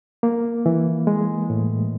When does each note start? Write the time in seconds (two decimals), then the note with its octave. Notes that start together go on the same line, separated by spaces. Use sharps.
0.23 A#3
0.66 E3
1.07 G#3
1.50 A2